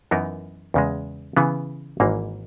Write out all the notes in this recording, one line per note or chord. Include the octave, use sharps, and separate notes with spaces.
F#2 E3 B3 D#4 A#4
E2 C#3 G#3
C#3 E3 B3
G#1 G#2 E3 A#3